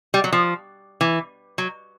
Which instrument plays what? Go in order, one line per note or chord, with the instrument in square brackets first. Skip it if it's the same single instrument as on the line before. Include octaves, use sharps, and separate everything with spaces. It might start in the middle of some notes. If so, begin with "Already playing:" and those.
[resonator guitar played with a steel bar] G3
F#3
F3
E3
F#3